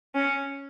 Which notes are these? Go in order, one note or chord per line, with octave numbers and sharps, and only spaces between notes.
C#4